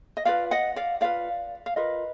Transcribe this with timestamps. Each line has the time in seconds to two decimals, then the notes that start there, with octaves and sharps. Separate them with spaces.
0.17 D#5
0.25 F4 B4 D5 F5
0.51 D#5 F#5
0.76 D5 F5
1.01 F4 B4 D5 F5
1.66 F5
1.76 F4 A#4 B4 D#5